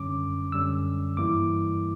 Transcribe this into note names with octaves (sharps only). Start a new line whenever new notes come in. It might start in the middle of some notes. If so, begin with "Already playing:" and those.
Already playing: F#2 D3 G3 C#4 D6
F#2 D3 G3 C#4 E6
G2 E3 G3 A#3 E4 D6